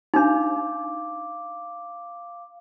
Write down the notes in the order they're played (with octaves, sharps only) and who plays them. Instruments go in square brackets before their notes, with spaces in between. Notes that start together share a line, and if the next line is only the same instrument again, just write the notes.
[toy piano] D4 D#4 [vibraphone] F5 D6